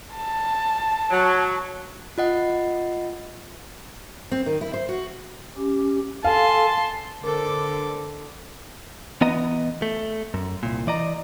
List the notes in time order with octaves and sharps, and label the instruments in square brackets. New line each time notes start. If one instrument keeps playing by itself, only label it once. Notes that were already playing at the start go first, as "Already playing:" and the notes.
[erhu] A5
[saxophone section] F#3
[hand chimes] F4 D#5 F#5
[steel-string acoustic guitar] C4
D#3
E4
C5
F#4
[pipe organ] C#4 G4
[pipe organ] A4 G#5 [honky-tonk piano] F5 [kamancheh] A5 C6
[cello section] D3 [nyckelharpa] A4 D6 [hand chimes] A#4 C5
[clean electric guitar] E3 B3 D#5 A#5
A3
F#2
C2 A#2
E3 D5 D#5 A#5